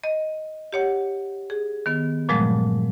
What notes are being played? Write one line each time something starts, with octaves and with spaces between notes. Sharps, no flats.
D#5
G4 C#5 F#5
G#4
D#3 B3
G2 A#2 F3 F#3 G#3 A3